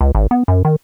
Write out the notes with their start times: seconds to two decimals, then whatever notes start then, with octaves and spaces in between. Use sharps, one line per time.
0.01 C#2
0.15 G#1
0.31 B3
0.48 F#2
0.65 D#3